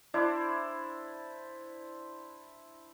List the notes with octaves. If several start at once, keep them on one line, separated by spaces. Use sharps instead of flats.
D4 E4 C5 D5